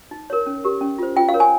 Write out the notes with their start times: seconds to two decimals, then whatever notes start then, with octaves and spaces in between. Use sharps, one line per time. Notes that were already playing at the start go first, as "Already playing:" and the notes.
0.11 D#4
0.30 A#4 C#5
0.46 C#4
0.64 G4 A#4
0.81 C#4
0.98 F4 C5
1.16 F4 G5
1.29 F5
1.34 A#4 C#5
1.40 G#5